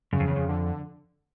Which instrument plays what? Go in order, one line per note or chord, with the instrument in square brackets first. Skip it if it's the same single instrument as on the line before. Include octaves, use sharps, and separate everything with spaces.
[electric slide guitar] F#2 [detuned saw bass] C#3
[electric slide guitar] F2
E2
F2
[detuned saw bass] D3